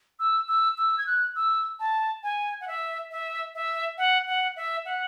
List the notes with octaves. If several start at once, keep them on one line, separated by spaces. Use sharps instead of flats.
E6
E6
E6
G#6
F#6
E6
A5
G#5
F#5
E5
E5
E5
F#5
F#5
E5
F#5